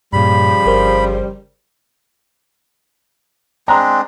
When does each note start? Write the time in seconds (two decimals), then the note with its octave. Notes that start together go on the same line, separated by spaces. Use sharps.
0.13 G2 A#2 C#3 F3 G3 B5
0.66 G1 A#4 C5
3.68 G#3 C4 D4 A#5